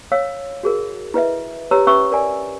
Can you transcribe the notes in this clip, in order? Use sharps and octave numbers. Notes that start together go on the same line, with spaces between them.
C#5 F5 E6
F#4 G#4 A#4
E4 B4 D#5 E5
G4 B4 C#5 A#5 E6
C#4 B4 E5 C#6 E6
A#4 D5 G#5